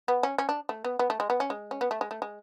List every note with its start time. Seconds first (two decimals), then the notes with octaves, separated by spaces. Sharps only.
0.08 B3
0.23 C#4
0.38 C#4
0.49 D4
0.69 A3
0.84 B3
0.99 B3
1.10 A3
1.20 G#3
1.30 B3
1.40 C#4
1.50 G#3
1.71 C#4
1.81 B3
1.91 A3
2.01 G#3
2.11 A3
2.22 G#3